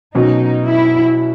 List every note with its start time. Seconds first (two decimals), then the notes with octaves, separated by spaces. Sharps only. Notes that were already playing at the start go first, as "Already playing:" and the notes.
0.15 B2 F#3 C#4 D#4
0.65 E4